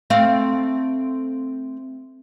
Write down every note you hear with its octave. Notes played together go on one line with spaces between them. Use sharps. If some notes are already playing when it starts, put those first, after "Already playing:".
A3 C4 F5